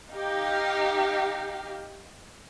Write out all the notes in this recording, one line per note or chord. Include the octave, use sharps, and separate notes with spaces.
D#4 G4 F5